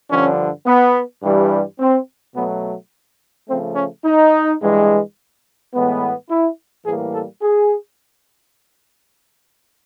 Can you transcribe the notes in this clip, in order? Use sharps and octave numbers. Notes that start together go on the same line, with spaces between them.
G2 D3 F3 C#4
B3
G2 E3 G3
C4
B2 F#3 A3 B3
C#3 F3 A3 C4
C#4
D#4
G2 E3 G#3
A2 E3 G#3 B3
E4
A2 E3 G3 A#3 G#4
A4
G#4